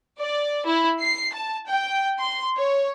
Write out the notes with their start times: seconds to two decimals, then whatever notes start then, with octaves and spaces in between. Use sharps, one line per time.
0.19 D5
0.66 E4
1.00 C7
1.34 A5
1.68 G5
2.19 C6
2.57 C#5